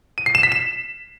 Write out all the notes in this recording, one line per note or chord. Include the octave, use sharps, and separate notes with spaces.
D#7
C7
E7
B6
E7